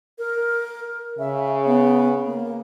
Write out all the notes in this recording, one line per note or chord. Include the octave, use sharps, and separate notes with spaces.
A#4
C#3 E5
B3
A#3